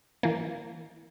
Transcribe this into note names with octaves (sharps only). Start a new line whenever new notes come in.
E3 A#3